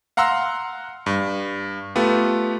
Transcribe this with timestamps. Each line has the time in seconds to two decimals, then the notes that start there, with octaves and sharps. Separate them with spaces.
0.17 F5 F#5 A#5 C6 E6
1.06 G2
1.95 A3 B3 F4 G4